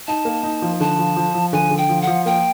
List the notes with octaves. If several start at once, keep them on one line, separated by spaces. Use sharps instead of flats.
D#4 A5
A#3
D#4
F3
D3 A5
F3
F3
F3
D3 G#5
D3
G5
F3
F#5
F3
A#3 G5